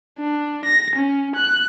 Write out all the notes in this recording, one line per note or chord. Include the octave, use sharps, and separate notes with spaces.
D4
A#6
C#4
F#6